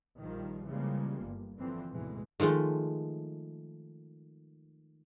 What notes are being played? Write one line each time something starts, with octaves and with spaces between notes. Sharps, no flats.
A#1 D#3 F3 G3
C#3 E3 F3 G3 G#3 A#3
G1
D3 E3 F3 C4
D2 G#2 B2 E3 G#3
D#3 F3 G#3 A3